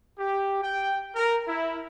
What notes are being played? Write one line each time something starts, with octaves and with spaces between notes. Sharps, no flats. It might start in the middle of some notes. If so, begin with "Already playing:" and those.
G4
G5
A#4
E4